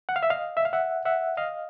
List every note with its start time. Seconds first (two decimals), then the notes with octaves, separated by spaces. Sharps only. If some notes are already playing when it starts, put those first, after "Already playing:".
0.09 F#5
0.16 F5
0.23 E5
0.30 D#5 F5
0.57 E5
0.65 F5
0.73 E5 F#5
1.05 E5 F#5
1.37 D#5 F5